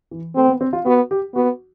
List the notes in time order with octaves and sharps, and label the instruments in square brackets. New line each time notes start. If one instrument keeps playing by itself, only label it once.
[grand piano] E3
[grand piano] A3 [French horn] C4
[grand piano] B3
C4
F4
[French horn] B3 [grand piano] F#4
[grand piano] G4
[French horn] B3 [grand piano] F#4